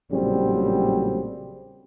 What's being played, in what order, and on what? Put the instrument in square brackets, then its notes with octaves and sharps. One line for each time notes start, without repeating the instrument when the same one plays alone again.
[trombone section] A#1 A2 C#3 F#3 G3 C4